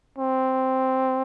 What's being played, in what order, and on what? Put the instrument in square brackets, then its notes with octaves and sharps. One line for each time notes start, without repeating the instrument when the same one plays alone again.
[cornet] C4